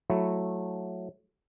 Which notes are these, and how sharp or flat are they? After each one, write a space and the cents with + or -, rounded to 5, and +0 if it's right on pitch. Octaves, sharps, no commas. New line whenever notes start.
F#3 -15 A3 -5 E4 +0